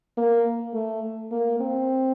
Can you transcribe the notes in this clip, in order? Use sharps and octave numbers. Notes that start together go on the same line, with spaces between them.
A#3
A3
A#3
C4